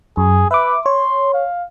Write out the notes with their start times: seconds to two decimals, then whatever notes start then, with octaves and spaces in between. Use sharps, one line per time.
0.17 F#2 G#4
0.51 B4 E5 D6
0.86 C#5 C6
1.34 F5